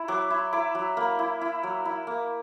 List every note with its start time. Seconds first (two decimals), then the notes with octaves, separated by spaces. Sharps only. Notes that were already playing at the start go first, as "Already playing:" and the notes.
Already playing: E4 B5
0.08 F#3 D6
0.30 E4
0.53 E4 D6
0.75 F#3
0.97 A#3 B5
1.19 E4
1.41 E4
1.63 F#3
1.85 E4
2.07 A#3